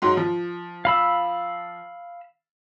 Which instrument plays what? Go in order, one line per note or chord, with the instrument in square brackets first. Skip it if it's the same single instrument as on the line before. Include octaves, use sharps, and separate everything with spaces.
[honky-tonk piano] G#2 F#3 C6
F3
[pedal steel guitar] F5 B5 E6